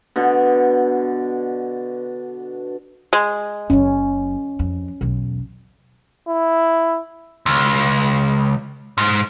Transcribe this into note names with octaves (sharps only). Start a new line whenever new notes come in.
B2 D3
G#3
F#1 F#2 C#4
F2
B1 E2
E4
C#2
G#2